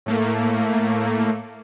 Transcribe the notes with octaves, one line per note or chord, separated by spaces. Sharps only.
A2 A3 A#3